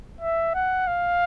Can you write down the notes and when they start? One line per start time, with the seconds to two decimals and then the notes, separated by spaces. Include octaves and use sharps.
0.21 E5
0.54 F#5
0.87 F5